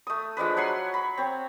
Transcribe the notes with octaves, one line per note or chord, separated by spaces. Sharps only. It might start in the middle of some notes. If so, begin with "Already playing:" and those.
A3 D#6
F3 G#3 D4 B4
F#3 C#5 F#5 C6
B5
C4 C#5